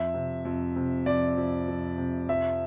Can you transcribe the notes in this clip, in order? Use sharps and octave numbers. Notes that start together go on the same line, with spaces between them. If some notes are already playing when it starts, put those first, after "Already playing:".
Already playing: F2 E5
C3
F2
C3
F2 D5
F2
F2
C3
F3 E5